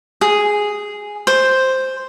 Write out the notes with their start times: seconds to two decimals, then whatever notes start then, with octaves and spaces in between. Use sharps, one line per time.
0.21 G#4
1.27 C5